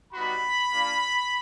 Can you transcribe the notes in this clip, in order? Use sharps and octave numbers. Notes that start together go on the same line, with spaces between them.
G3 B3 D#4 F#4 B5
A#3 D4 F4